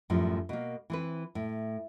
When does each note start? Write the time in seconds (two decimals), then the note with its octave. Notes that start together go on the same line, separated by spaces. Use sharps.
0.10 F#2 A2 F3 G3
0.49 B2 A#3
0.90 E3 C4 B4
1.35 A2